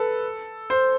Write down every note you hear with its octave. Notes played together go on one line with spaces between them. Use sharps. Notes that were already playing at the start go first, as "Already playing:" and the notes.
Already playing: A4 B4
C5